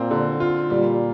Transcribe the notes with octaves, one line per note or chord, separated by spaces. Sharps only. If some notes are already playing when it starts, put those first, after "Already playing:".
Already playing: A#2 C4 F4
D3
F4
A#2 G3